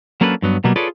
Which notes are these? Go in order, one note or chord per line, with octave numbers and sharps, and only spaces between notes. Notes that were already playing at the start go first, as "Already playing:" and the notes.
F#3 A#3 C#4 D4 A4 B4
G2 F#3 B3
B2 F#3 G3 A#3 B3
F4 G#4 A4 B4 C#5 D5